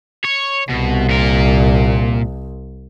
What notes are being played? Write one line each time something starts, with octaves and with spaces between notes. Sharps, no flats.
C#5
C2 B2
A#2 A#4